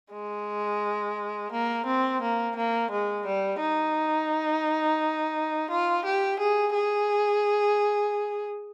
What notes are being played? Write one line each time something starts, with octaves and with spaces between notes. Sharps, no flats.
G#3
A#3
C4
A#3
A#3
G#3
G3
D#4
F4
G4
G#4
G#4